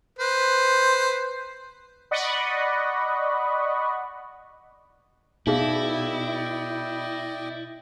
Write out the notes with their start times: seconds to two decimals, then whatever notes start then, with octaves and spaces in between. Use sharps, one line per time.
0.19 B4 C5
2.11 D5 D#5 F#5 B5 C#6
5.47 B2 D#4 E4 G#4 D5 D#5 F5 G5